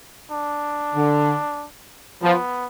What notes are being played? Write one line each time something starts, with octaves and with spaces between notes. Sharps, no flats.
D4
D3
F3 B3